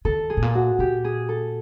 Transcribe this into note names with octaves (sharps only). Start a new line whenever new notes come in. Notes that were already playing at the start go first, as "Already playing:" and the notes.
D#3 A4
G#4
A2
A#2
F#4
A#2 G4
G#4
A4